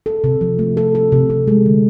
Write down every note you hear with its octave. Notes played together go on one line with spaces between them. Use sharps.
A4
C3
F3
A3
A4
A4
C3
C3
G#3
D3